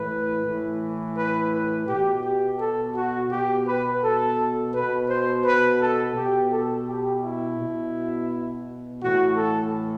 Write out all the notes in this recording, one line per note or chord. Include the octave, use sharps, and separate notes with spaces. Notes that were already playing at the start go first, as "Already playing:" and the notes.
Already playing: A2 E3 B4
A2 E3
B4
B4
B2 G4
G4
A4
F#4
B2 G4
B4
A4
B2 B4
C5
B4
A4
B2 G4
A4
G4
E4
B2
A2 E3 F#4
A4